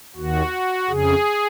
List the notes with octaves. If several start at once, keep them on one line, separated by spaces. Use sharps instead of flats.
D#2 D#3 F#4
F2 C#3 G#4